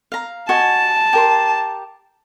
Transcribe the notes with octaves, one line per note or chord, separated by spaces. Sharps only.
F5 A#5
F#4 D#5 G#5 A5
G4 A#4 C6